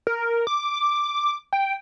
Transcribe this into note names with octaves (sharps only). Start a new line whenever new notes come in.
A#4
D6
G5